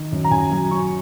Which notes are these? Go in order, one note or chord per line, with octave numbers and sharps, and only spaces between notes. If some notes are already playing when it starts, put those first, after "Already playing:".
Already playing: D#3
F#2
A#5
F#2 G#5
F#3
F#3 C#6